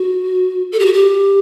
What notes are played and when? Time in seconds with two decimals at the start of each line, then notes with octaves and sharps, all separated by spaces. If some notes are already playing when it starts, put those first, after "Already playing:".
Already playing: F#4
0.72 A4
0.79 G4
0.86 F#4
0.93 G4